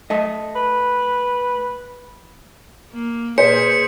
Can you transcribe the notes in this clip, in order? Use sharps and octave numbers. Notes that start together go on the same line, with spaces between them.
A3 D#5
B4
A#3
A#2 G#4 B4 C5 C#7